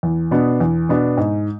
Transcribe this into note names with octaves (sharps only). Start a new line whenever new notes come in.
E2
B2 B3 D4
E2
B2 B3 D4
G#2